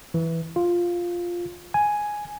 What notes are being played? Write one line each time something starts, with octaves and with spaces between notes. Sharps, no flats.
E3
F4
G#5